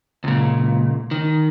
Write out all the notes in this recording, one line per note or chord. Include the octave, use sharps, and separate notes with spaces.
C#2 A#2
D#3